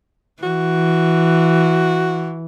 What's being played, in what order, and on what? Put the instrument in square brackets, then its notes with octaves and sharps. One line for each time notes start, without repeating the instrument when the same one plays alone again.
[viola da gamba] E3 [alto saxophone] F#4